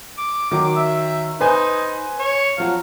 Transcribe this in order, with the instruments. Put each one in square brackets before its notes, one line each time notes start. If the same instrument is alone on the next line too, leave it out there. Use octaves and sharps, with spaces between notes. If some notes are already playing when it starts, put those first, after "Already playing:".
[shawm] D6
[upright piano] D#3 F#3 [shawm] D6
[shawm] E5
[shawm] D#4 [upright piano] B4 C5 G#5
[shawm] C#5
[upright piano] F3 F#3 F#4 [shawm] F5